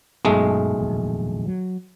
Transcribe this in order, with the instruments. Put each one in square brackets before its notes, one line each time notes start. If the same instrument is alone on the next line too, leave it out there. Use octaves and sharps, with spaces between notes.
[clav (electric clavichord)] B1 G#3 A3 [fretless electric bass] G2 B2 C#4
[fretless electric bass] F1 A#1 D#2
F#3